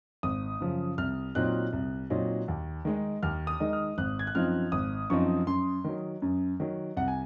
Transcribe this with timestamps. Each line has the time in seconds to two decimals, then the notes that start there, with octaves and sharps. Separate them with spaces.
0.23 G#1 D#6
0.60 F#2 C#3 F3
0.98 C2 F6
1.35 A#2 F#3 C4 D#4 F#6
1.73 C2
2.10 A#2 F#3 C4 D#4
2.48 D#2
2.85 D#3 G#3 D#4
3.23 D#2 F6
3.47 D#6
3.60 D#3 G#3 D#4
3.73 F6
3.98 G#1 F#6
4.19 G#6
4.27 F#6
4.35 F#2 F3 C4 D#4 F6
4.72 G#1 D#6
5.10 F#2 F3 C4 D#4 C#6
5.47 F#2 C6
5.84 D#3 F#3
6.22 F#2
6.60 D#3 F#3
6.97 C2 F#5
7.08 G#5